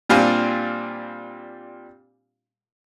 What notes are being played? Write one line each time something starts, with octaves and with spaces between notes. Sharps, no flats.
A#2 G3 C4 D4 F4 G#5